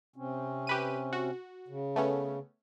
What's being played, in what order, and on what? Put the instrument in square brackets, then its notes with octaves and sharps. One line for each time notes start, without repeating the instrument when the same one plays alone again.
[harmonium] C3 C4 C#4
[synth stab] G4 B4 D#7
F#4
[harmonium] C#3
[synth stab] A3 B3 C#4